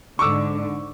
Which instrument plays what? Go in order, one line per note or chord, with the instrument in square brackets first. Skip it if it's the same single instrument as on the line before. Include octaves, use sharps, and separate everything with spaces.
[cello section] G#2 D3 [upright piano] C#6 D6 E6